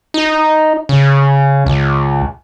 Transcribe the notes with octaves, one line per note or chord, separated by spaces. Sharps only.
D#4
C#3
C#2